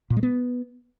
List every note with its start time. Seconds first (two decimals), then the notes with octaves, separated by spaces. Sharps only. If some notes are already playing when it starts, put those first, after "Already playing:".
0.10 A#2
0.17 G#3
0.23 B3